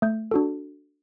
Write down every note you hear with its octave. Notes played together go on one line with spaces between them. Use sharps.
A3 G6
D4 F#4 A4